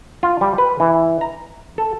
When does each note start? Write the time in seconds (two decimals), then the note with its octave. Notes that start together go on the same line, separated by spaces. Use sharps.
0.23 F4
0.41 G3
0.58 B4
0.80 E3
1.21 A#5
1.78 A4